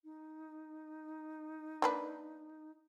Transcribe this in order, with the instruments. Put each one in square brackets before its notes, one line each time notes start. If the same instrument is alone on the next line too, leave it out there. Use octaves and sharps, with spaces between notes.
[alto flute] D#4
[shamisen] A#3 D4 B4